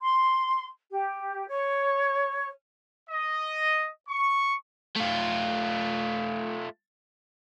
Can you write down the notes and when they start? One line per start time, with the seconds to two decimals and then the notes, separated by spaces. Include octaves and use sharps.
0.01 C6
0.92 G4
1.49 C#5
3.09 D#5
4.09 C#6
4.96 A3 F4